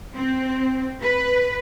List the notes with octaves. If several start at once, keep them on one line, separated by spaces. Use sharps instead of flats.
C4
B4